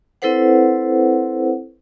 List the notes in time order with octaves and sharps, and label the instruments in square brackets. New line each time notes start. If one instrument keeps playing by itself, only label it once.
[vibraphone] C4 E4 A4 B4 C5 F#5